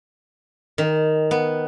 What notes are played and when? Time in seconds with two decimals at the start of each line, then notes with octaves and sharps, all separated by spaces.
0.78 D#3
1.31 B3